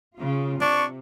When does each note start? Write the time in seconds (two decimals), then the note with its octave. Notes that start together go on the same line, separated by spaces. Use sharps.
0.17 C#3 F4
0.61 C3 D4 C#6